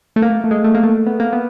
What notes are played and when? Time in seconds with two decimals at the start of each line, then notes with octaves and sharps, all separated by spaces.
0.16 A3
0.22 A#3
0.44 A3
0.51 G#3
0.64 A3
0.74 A#3
0.83 A3
1.06 B3
1.20 A#3
1.33 B3